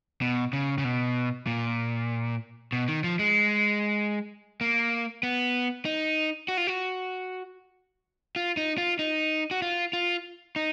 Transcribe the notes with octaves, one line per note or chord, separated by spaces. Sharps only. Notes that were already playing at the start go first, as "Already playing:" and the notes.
B2
C#3
C#3
B2
A#2
B2
D#3
F3
G#3
A#3
B3
D#4
F#4
F4
F#4
F4
D#4
F4
D#4
F#4
F4
F4
D#4